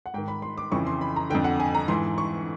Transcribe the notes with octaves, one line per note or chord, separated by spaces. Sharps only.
F#5
G#2 D#3 G5
B5
C6
D6
F2 C#3 E3 C#6
C6
B5
A#5
F2 D3 G5
F#5
G#5
A#5
G#2 E3 C6
C#6